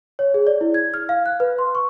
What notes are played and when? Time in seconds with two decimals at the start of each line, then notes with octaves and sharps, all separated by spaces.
0.19 C#5
0.34 G#4
0.47 D5
0.61 E4
0.74 G#6
0.94 F6
1.09 F5
1.26 F#6
1.40 B4
1.59 C6
1.75 C#6